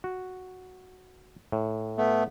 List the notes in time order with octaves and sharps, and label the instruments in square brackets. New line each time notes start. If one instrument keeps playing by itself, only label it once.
[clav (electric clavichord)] F#4
A2
[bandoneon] A3 B3